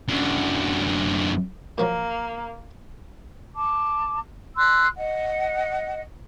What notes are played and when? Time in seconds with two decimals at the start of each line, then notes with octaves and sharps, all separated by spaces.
0.08 F#2 D3
1.78 A#2 F3 F#3 A#3
3.56 A5 D6
4.57 C6 E6 F#6
4.97 D#5 F#5